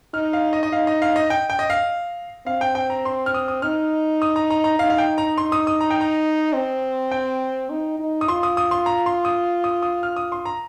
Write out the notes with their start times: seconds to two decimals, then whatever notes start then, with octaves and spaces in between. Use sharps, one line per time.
0.14 D#4 F6
0.33 F5
0.53 D#5
0.63 D#5
0.72 D#4 F5
0.87 D#5
1.02 F5
1.16 D#5
1.30 G5
1.50 G5
1.59 D#5
1.70 F5
2.47 C4 F5
2.61 G5
2.75 G5
2.90 A#5
3.05 C6
3.26 F6
3.34 D#6
3.48 D#6
3.62 D#4 F6
4.22 D#6
4.36 A#5
4.50 A#5
4.64 A#5
4.79 D#4 F5
4.90 F5
4.98 G5
5.18 A#5
5.38 C6
5.52 D#6
5.67 D#6
5.81 A#5
5.91 G5
6.01 A#5
6.53 C4
7.12 G5
7.70 D#4
7.99 D#4
8.21 D#6
8.28 F4 C6
8.43 D#6
8.57 D#6
8.71 C6
8.86 A#5
9.06 C6
9.25 D#6
9.64 D#6
9.82 D#6
10.03 F6
10.16 D#6
10.32 C6
10.45 A#5